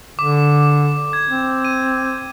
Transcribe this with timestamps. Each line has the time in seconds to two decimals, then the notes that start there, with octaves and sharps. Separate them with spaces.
0.19 D3 D6
1.13 G#6
1.30 C4
1.65 D#7